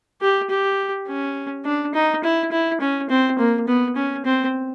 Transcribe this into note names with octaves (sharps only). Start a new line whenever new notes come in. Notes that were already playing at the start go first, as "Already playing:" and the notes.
G4
G4
C#4
D4
D#4
E4
E4
C#4
C4
A#3
B3
C#4
C4